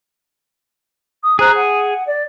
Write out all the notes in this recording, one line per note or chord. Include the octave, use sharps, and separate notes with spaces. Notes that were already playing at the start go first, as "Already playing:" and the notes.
D#6
G#4 C5 A#5 F#6
F#5
D5